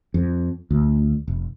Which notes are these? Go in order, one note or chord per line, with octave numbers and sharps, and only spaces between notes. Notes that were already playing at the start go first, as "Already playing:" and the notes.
F2
D2
F1